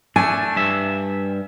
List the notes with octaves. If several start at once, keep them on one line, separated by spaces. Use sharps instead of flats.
A3 D4 G#5
G2 E5